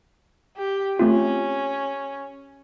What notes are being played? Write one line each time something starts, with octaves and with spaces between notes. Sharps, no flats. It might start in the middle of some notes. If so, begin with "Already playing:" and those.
G4
A3 C4 C#4 F4